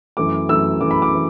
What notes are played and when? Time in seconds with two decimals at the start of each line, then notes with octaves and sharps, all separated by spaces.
0.17 F#2 E3 A3 D6
0.49 F#2 E3 A3 E6
0.81 F#2 E3 A3 D6
0.91 B5
1.02 D6
1.15 E3